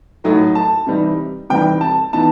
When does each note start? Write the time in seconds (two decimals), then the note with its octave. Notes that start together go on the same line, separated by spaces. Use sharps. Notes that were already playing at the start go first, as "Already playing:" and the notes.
0.24 A2 F#3 A3 D#4
0.55 A5
0.87 C3 E3 G3 C4 D#4
1.50 C3 E3 G3 C4 D#4 G5
1.81 A5
2.13 E3 B3 D#4 A5